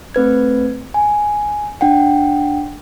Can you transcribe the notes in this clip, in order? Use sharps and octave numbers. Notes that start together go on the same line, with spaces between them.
A3 C4 B4 G#6
G#5
D4 F#5 G5